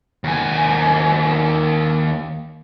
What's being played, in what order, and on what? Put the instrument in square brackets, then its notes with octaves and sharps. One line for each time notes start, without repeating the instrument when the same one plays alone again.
[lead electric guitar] D#2 G#5